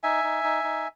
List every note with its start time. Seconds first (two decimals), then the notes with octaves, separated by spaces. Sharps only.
0.03 D#4 E5 G#5
0.24 D#4
0.44 D#4
0.64 D#4